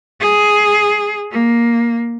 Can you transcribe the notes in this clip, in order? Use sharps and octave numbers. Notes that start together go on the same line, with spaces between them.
G#4
A#3